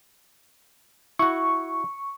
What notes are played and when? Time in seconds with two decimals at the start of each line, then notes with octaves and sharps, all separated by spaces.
1.19 E4 F#4 C#6